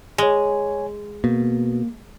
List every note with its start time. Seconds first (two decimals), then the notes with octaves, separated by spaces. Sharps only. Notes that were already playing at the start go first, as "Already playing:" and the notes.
0.18 G#3 C#5 G#5
1.24 B2 A#3